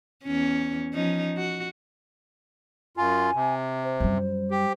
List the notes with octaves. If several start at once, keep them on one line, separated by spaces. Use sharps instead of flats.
E2 C#4
F3 C#4 D#4
F#4
F#2 F4 G#5
C3
C5
F#2 G3
G4